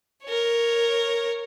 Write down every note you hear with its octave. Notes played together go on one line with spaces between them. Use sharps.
A#4 C#5